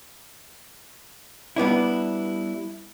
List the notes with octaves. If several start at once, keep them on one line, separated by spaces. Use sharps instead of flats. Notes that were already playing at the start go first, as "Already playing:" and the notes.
G3 B3 D4 E4